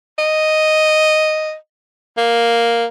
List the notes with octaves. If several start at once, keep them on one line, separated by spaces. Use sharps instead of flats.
D#5
A#3